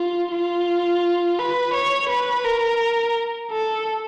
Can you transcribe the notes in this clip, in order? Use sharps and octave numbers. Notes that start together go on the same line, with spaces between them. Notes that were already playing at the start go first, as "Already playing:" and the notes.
Already playing: F4
F4
B4
C#5
B4
A#4
A4